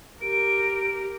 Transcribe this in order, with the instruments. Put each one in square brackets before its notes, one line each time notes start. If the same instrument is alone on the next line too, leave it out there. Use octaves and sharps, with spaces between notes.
[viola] G4 A#4 [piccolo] D7